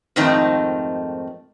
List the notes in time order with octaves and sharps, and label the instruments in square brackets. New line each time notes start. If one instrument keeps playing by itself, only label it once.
[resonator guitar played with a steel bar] F2 G#2 D#3 A3 C4 D#4